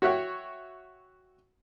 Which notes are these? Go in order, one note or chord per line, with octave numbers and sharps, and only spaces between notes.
F#4 C#5 E5 F#5 G5